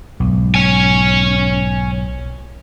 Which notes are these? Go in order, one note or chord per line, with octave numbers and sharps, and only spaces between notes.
B1 G#2
C#5 G#5